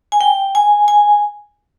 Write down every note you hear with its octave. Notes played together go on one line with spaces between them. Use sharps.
G#5
G5
G#5
G#5